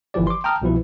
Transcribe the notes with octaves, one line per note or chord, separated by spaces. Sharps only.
G1 E3 F3 G4 D5
C6 D6
G5 A5 A#5 D#6 F6
C2 B2 F3 E4 B4